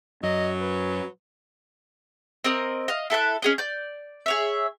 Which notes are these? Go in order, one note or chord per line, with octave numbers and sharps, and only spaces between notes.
F#2 F#3 D#5
B4
C4 A#4 D#5
D#5 F5
E4 A4 E5 F#6
C#4 G#4 D#5
D5 G6
G#4 C#5 E5